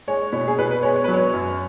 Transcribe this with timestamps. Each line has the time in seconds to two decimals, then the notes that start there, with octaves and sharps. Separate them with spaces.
0.08 G#3 C#5
0.33 B2 C#5
0.48 G#4
0.58 B2 B4
0.71 B4
0.83 G#3 C#5
0.96 C#5
1.04 F#3 B4
1.14 C#5
1.33 F#2